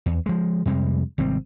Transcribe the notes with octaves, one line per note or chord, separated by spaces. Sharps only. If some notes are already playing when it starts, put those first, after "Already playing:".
E2
F3 G#3
F2 C3 G3 G#3
G#1 C3 G3 C4